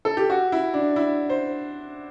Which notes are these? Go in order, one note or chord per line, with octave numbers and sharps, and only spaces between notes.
A4
G4
F#4
E4
D4
E4
C5